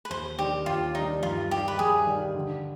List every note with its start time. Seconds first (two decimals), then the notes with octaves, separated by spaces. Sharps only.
0.05 B4
0.10 D#2 C5
0.39 D#3 G3 D4 G4
0.66 D#2 F4
0.95 D#3 G3 D4 D#4
1.23 G2 F4
1.51 D#3 G3 G4
1.68 B4
1.79 G2 G#4
2.07 D#3 G3
2.35 D3